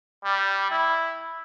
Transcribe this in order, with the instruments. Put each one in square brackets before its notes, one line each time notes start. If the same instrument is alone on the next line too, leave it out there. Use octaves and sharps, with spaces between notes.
[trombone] G3
E4